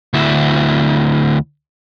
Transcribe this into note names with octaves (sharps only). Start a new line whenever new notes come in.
D2 E4